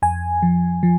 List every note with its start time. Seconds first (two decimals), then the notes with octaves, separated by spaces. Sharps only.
0.02 F2 G#5
0.43 F3
0.83 F3